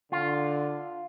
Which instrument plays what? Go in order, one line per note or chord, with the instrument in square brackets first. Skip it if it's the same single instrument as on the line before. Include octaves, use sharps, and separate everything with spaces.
[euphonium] D3 [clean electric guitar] F4